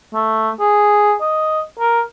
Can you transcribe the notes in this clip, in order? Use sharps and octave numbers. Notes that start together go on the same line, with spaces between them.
A3
G#4
D#5
A#4